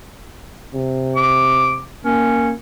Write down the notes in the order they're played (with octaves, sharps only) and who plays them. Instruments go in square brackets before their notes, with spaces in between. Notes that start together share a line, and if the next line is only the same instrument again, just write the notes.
[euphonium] C3
[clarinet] D6
[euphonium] A#3 [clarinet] C#4